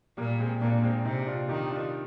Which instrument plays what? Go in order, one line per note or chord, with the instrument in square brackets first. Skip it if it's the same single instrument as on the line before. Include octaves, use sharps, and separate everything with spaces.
[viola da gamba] A#2 [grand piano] G3 A#3
[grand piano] G#3 C4
[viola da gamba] A#2 [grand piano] A#3 D4
[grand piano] G#3 C4
[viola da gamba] C3 [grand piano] C4 D#4
[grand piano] D4 F4
[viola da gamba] D#3 [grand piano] D#4 G4
[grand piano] D4 F4